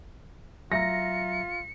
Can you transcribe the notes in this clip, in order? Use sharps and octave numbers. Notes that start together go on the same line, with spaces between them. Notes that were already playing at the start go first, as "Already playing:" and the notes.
F#3 F4 E5 A#5 A#6 C#7